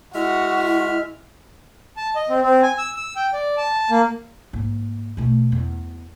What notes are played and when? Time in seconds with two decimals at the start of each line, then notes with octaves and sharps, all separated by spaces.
0.14 G#3 E4 F#4 E5 F6
1.97 A5
2.16 D#5
2.29 C4
2.43 C4
2.63 G#5
2.78 E6
2.96 E6
3.16 G5
3.33 D5
3.58 A5
3.91 A#3
4.53 G#2 A#3
5.17 B2 A3
5.52 E2